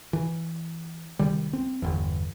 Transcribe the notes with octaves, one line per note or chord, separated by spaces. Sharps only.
E3
C2 D#3 G3
C4
G1 E2